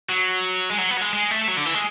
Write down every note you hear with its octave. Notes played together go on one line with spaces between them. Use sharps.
F#3
G#3
F#3
B3
F#3
G#3
G#3
A3
F#3
D3
E3
G#3